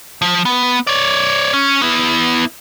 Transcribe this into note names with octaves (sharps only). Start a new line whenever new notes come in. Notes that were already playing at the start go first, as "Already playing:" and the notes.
F3
B3
C#5 D5
C#4
B3 E4